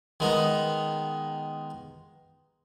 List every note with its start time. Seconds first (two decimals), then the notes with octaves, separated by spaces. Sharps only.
0.20 D#3 G#3 B3 D#4